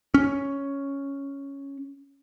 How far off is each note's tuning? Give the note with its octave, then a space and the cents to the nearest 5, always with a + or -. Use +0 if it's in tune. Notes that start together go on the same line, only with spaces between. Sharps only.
C#4 +0